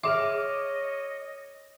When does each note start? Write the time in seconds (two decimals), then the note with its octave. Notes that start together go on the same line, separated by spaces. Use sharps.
0.03 G#4 C#5 D#5 E5 D6 F6